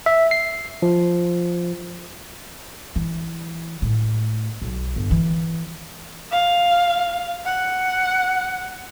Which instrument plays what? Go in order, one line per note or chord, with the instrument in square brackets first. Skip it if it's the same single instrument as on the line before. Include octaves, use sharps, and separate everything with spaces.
[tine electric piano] E5
C7
F3
[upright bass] E3
A2
B1
G1
E3
[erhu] F5
F#5